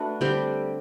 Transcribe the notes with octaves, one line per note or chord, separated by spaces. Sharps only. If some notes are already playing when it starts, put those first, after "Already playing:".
Already playing: A3 D4 F#4 B4
D3 G3 C4 G4